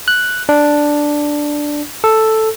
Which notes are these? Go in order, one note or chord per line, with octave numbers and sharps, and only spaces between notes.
F#6
D4
A4